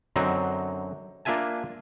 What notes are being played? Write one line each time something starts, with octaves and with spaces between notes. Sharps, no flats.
F#2 D3 F#3 C4 D#4
A#3 D4 F4 E5 G#5 A5